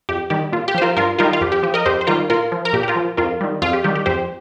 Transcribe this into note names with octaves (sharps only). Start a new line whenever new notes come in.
F2 G4
D#3 G3 G4
A#2 F4
G4
F3 C5
F4 A#4
G2 F4 A#4
D#3 G3 F4 A#4
F4
F2 G4
G4
F3 G4
A#4 D#5
F2 G4 C5
C5
D#3 G3 F4 A#4
A#2 F4 A#4
F3
A#4
A#2 G4
G4
F4 A#4
F3
F2 F4 A#4
D#3 G3
F2 F4
G4
D#3 G3 G4
G4
F2 G4 C5